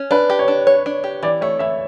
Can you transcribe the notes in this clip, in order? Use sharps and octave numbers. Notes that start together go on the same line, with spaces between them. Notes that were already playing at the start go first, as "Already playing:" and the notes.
Already playing: C#4
D4 B4
G4
C#5
D4
C#5
D4
G4
E3 D5
A3 C#5
E3 E5